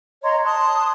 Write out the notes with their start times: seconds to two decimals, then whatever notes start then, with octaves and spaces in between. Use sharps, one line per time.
0.23 C#5 D#5 A#5 C6
0.44 A5 C6 D#6 F#6